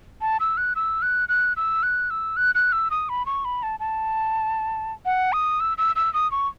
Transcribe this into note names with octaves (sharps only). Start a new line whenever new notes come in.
A5
E6
F#6
E6
F#6
F#6
E6
F#6
E6
F#6
F#6
E6
D#6
B5
C#6
B5
A5
A5
F#5
D#6
E6
E6
E6
D#6
C#6